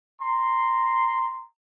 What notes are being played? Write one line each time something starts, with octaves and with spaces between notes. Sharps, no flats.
A#5 C6